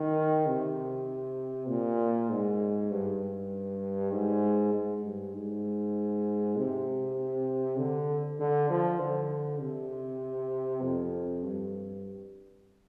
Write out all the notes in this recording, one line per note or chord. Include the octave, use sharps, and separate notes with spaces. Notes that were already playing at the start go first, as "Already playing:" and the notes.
Already playing: D#3
C3
A#2
G#2
G2
G#2
G#2
G2
G#2
C3
D3
D3
F3
D3
C3
F2
G2